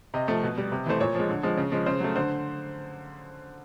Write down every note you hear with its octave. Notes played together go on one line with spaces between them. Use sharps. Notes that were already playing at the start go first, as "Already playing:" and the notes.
C3 D#5
F3 A3
B2
G3
C3
E3 A3 C5
A#2 C#5
F3 G#3
D3
F3 G#3
C#3
F3 G#3
C#3 C5
F#3 A3
D3 C5